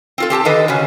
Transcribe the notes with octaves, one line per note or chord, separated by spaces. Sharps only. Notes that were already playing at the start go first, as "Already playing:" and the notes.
C4 F4 A4
C4 G4 G#5 A5
D3 D#3 A4 B4 D#5
C#3 C#4 F#4